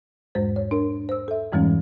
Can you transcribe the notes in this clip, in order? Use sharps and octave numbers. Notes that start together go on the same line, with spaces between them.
E2 G#2 G#3 C5
C#5
D4 A#4
C5 E6
A4 E5
F2 G#2 E3 G3 G#3 C#4